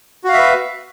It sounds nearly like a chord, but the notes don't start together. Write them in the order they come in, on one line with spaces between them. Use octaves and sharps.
F#4 F5 E5 B4